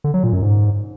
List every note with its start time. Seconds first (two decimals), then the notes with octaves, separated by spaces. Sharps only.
0.04 D3
0.14 F#3
0.23 A#2
0.33 F#2
0.42 G#2